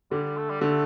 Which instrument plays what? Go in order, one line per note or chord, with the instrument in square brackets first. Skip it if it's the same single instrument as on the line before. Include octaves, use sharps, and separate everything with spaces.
[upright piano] D3 [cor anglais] G3
[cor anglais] A3
G3
[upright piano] D3 [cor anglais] A3